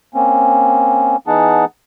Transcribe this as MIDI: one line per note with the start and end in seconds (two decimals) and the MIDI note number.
0.14 1.16 58
0.14 1.16 60
0.14 1.16 61
1.27 1.65 52
1.27 1.65 59
1.27 1.65 63
1.27 1.65 68
1.27 1.65 78
1.27 1.65 81